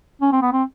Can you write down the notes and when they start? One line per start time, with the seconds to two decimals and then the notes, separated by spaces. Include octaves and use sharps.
0.22 C#4
0.32 C4
0.42 B3
0.52 C4